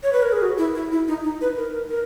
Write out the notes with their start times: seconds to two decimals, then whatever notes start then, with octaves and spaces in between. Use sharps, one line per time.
0.03 C#5
0.13 B4
0.23 A#4
0.32 G#4
0.42 F#4
0.58 E4
0.75 E4
0.92 E4
1.08 D#4
1.24 D#4
1.41 B4
1.57 A#4
1.90 A#4